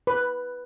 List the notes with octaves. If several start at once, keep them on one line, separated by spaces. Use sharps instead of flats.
B4